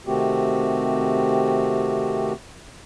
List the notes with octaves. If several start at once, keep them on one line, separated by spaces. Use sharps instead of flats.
C3 D#3 A3 C4 F#4 G4